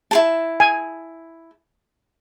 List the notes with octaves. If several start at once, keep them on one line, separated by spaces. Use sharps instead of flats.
E4 G#4 A5
G#5